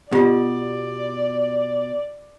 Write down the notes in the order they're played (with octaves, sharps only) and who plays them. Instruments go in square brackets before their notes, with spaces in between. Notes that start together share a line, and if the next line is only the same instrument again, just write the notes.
[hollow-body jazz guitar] B2 [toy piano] F4 G4 [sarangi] D5